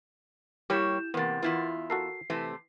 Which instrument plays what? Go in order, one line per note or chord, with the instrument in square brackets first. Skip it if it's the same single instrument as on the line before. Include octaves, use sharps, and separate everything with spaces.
[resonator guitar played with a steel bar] G3 A#3 C#5 [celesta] E4 G6 E7 [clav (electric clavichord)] G4
[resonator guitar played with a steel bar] E2 C3 [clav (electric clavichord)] A#3 B3 [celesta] A#4 F#5 A6
[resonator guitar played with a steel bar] E2 E4 F4 [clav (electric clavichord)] B3
[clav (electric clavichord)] F#4 A4 A#4 [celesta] C7
[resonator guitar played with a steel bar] C3 A3 [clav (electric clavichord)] E3